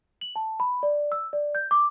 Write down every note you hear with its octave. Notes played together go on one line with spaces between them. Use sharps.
F#7
A5
B5
D5
E6
D5
G6
D6